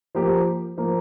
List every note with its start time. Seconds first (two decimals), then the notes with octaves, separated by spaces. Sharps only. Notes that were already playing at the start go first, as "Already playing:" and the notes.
0.15 F3 A#3 G4
0.77 F3 A#3